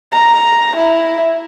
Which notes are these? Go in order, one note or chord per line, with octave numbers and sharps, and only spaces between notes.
A#5
E4